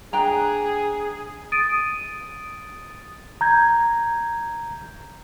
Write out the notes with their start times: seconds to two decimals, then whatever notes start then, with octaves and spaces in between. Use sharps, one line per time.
0.13 D4 G#4 G5 A#5
1.52 D#6 A6 D7 D#7
3.41 A#5 G6 G#6